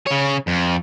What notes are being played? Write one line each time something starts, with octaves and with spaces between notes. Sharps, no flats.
C#3 C#5
F2